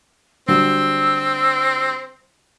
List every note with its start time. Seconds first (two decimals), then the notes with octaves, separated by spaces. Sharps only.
0.48 D3 F#3 G3 C4 E6